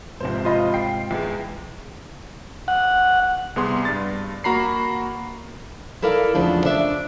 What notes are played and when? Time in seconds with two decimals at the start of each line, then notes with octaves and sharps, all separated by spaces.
0.20 F#1 G#2 C3 F3 C5
0.45 F4 D#5 B5
0.74 G5 C7
1.11 E2 G#3
2.68 F#5
3.56 C2 B3 G#4 C6
3.85 G2 A6
4.44 A#3 F#4 A#5 B5 C7
6.02 E4 A4 A#4 D5 F5
6.35 E2 C#3 F3 D4
6.65 D4 D5 E5